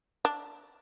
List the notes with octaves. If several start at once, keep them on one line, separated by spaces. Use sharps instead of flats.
D4